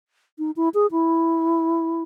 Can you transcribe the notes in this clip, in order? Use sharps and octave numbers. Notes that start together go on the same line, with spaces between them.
D#4
E4
G#4
E4